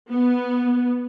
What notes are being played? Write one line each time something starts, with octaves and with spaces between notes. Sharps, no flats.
B3